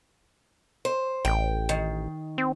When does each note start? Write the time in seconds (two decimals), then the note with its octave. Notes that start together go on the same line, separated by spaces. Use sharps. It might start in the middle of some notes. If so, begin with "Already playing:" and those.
0.85 C5
1.25 A1 G5
1.69 D#3
2.38 C4